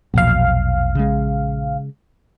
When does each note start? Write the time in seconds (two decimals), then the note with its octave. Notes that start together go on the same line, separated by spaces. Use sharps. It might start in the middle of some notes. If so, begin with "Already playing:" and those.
0.14 A#1 E2 B2 F#3 F5
0.95 C#3 G#3